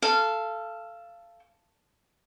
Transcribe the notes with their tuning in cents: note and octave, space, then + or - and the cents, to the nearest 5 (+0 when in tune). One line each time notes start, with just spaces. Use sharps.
A4 +0 F5 -20